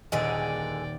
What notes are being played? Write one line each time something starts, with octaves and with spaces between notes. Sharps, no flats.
D#1 A#2 D3 G#4 D5 D#5 G5